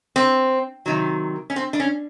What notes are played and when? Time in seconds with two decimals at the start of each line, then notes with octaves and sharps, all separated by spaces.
0.16 C4
0.86 C3 D#3 F#3
1.50 C#4
1.56 C4
1.73 D4
1.80 C#4